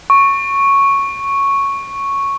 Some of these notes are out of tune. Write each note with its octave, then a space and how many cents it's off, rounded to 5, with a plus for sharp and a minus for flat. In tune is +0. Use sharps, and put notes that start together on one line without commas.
C#6 -5